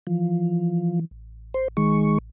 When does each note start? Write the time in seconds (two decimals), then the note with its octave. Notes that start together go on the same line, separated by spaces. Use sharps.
0.07 E3 F3
1.11 A1
1.54 C5
1.77 D#3 G#3 C#6